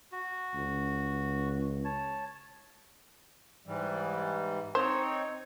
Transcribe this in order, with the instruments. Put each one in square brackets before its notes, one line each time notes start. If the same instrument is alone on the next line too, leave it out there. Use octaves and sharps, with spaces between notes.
[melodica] F#4
[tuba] C#2
[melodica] C#5 A5
[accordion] G#2 E3 G3
[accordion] C4 D#4 C#5 [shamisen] C5